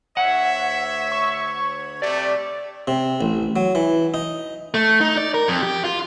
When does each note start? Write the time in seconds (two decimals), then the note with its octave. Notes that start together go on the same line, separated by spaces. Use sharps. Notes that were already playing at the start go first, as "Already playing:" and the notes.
0.17 D2 C#5 E5 F#5
1.12 C#6
2.02 C3 G3 A3 G4 D5
2.88 C3
3.21 A1
3.56 F#3
3.75 E3
4.14 D#4
4.74 A3
5.01 D#4
5.17 D5
5.34 A#4
5.48 F2
5.62 G4
5.84 F4